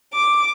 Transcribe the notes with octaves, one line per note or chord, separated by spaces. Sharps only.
D6